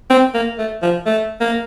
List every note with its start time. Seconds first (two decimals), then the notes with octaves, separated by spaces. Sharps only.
0.10 C4
0.34 A#3
0.58 A3
0.82 F3
1.06 A3
1.41 A#3